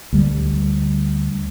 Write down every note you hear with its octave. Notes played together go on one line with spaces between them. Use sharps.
D2 G3